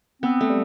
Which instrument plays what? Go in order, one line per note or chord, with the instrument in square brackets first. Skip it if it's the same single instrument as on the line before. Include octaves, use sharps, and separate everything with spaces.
[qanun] B3 [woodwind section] C4
[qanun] A3
[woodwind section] G3